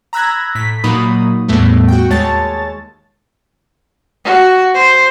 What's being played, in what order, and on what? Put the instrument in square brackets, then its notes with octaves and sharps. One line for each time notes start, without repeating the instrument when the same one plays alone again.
[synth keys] A#5 B5 E6 F#6 G#6 A#6
A2 B6
A#2 F#3 A#3 D#4 B5 D#6
E2 A2 G3 A3 B3
F#4 G5
D#2 G#3 C#5 A5 A6
[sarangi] F#4
C5